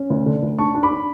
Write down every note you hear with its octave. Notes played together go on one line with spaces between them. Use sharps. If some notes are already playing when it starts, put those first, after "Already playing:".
Already playing: C#4
D2
D3
D2
D4 A5 C#6
D4
B5 D6
D4